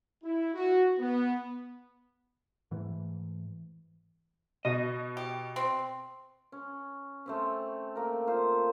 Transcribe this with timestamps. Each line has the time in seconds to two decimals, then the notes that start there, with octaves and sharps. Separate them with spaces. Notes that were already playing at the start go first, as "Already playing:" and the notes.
0.23 E4
0.54 F#4
1.00 B3
2.71 G#2 E3 A3
4.65 B2 D#5
5.17 G4
5.56 C4
6.52 C#4
7.26 A3 C4 C#4
7.40 C4
7.95 A3 A#3 A#4
8.27 F4 C5